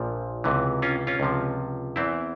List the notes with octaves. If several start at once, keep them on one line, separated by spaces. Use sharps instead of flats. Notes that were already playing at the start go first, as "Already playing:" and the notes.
Already playing: A#1 A#2 F3
C#2 C3 E3
C#4 F4
C#4 F4
C#2 C3 F3
E2 E3 C4 E4